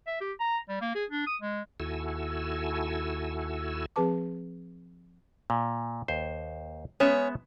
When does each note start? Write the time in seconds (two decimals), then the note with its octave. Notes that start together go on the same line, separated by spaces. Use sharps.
0.07 E5
0.21 G4
0.40 A#5
0.69 G3
0.81 A#3
0.95 G#4
1.10 D4
1.27 D#6
1.42 G#3
1.80 D#2 E4 F#4 A4 G#5 E6
3.96 F3 C4 G#4 B4 A5 D6
5.50 A#2
6.08 D#2 C5
7.00 G#3 B3 C#4 E5